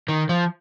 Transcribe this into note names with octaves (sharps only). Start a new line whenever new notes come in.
D#3
F3